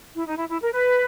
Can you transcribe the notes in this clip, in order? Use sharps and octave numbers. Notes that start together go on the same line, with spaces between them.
E4
D#4
E4
E4
A#4
B4